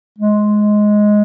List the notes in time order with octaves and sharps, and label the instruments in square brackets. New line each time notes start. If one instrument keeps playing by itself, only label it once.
[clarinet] G#3